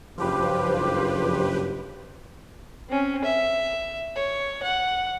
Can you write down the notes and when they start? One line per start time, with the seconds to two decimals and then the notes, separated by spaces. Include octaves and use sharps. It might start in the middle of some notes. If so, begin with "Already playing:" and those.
0.18 F#1 G2 F3 F4 G4 B4 C5 D6
2.89 C4 C#4
3.24 E5
4.16 C#5
4.63 F#5